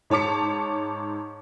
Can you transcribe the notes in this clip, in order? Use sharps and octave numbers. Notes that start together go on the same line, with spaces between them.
G#2 C#5 A5 D6 C#7